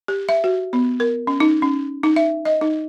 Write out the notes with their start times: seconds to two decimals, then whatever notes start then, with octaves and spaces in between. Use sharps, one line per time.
0.08 G4
0.29 E5
0.44 F#4
0.73 B3
1.00 A#4
1.27 C#4
1.40 D#4
1.62 C#4
2.03 D#4
2.16 E5
2.45 D#5
2.61 D#4